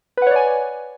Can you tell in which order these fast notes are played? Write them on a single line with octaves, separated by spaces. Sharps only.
B4 F#5 C#5 D5 G#5